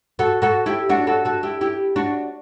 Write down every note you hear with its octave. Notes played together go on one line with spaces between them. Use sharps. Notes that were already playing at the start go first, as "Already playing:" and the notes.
F#4 A4
F#4 A4
E4 G4
D4 F#4
F#4 A4
F#4 A4
E4 G4
E4 G4
D4 F#4